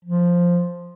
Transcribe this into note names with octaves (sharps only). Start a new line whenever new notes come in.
F3